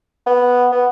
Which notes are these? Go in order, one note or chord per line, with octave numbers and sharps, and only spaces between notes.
B3
B3